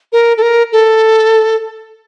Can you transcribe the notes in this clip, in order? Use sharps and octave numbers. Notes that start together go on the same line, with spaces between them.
A#4
A4
A#4
A4